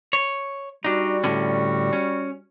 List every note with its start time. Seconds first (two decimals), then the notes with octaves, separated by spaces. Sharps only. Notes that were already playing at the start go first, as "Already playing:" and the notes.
0.13 C#5
0.84 G3 D4 D#4 F#4
1.24 A2 D3 C#4
1.93 C#4